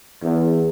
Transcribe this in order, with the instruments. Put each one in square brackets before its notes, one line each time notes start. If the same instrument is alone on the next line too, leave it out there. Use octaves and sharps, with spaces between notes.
[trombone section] E2